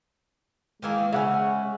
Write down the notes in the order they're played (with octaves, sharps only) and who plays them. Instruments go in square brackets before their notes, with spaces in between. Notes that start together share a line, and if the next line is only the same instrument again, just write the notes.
[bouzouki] D#3 E3 A#3 [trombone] G#3
[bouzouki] C#3 C#4 [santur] E5 F#5 G#5